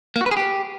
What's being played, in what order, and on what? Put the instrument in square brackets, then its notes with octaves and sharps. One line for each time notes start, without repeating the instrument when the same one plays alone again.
[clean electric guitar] A#3
F#4
B4
G#4
G4